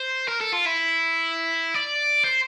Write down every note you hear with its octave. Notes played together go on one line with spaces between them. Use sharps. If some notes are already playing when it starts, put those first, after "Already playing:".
Already playing: C5
A#4
A4
F4
E4
D5
C5